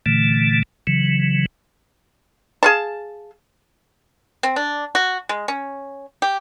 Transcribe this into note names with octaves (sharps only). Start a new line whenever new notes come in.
A#2 D3 E3 A3
C#3 E3 F#3
G#4 F5 A5
C4
D4
F#4
G#3
C#4
G4